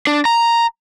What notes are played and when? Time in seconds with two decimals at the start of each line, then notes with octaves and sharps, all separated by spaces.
0.07 D4
0.25 A#5